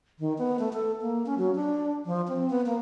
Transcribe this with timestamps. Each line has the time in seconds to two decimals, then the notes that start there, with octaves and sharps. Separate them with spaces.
0.19 D#3
0.38 B3
0.59 A3
0.73 A4
1.01 A#3
1.26 C#4
1.38 F#3
1.55 D4
2.06 F3
2.28 C4
2.50 B3
2.66 A#3